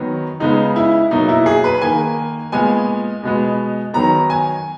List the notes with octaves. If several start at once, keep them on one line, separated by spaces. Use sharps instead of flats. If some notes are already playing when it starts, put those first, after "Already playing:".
Already playing: D#3 F#3 B3
C#3 G#3 B3 D#4
E4
B2 F#3 A#3 D#4
E4
G#4
B4
D#3 A#3 G#5
A#2 G#3 B3 G#5
B2 G#3 B3
D#3 F#3 B3 A#5
G#5